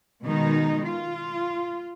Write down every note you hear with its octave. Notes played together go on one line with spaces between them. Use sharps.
B2 D#3 G#3 D#4
F4